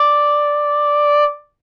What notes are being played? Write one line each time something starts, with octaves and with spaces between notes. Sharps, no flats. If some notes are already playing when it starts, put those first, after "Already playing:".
Already playing: D5